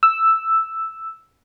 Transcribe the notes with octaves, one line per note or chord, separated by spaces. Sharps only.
E6